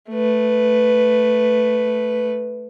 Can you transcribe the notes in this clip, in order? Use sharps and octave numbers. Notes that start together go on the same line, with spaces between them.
A3 B4